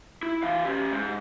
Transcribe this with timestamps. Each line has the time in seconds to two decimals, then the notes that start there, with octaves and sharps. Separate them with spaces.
0.23 E4
0.43 E3 F5
0.65 C#4 G4
0.92 G#2